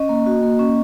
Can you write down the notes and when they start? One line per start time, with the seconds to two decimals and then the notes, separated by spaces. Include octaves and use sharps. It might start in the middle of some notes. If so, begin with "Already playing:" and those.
Already playing: C#4 D#5
0.09 A#3
0.26 F#4
0.43 A#3
0.59 C#4